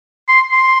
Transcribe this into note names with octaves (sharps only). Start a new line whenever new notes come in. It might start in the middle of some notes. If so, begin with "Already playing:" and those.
C6
C6